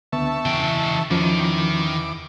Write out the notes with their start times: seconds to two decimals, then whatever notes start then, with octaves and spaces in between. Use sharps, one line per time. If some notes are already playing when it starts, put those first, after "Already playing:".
0.13 C#2 D3 B3 E5 A5 C#6
0.46 E2 C#3 E3 G5
1.11 E2 D#3 F3 C#4 D6